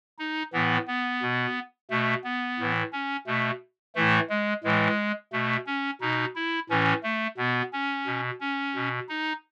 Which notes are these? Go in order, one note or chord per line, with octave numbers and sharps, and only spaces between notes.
D#4
A2 E3 B3
B3
B2
B2 A3
B3
A2 E3
C#4
B2 A3
A2 E3 A3
G#3
A2 E3 G#3
B2 A3
C#4
B2 D#4
E4
A2 E3 C#4
A3
B2 B3
C#4
B2
C#4
B2
D#4